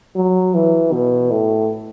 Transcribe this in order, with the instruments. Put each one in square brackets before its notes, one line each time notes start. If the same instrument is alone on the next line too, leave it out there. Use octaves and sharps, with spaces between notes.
[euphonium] F#3
E3
B2
A2